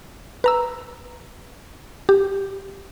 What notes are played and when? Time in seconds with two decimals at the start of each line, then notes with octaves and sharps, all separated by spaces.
0.44 B4 A#5 E6
2.09 G4